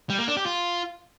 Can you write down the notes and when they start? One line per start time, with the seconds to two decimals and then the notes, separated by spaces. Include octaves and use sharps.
0.10 G3
0.19 A#3
0.28 D4
0.37 G4
0.46 F4